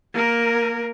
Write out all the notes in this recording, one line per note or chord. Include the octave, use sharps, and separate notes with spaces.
A#3 A#4